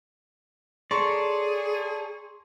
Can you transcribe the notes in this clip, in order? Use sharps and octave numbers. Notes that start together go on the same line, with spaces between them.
G#4 A4 C#5 D5 A#5 C6 C#6